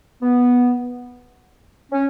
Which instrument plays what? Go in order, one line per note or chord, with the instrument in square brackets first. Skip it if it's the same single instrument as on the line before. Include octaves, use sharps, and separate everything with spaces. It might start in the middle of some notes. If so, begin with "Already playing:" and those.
[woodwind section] B3
C#4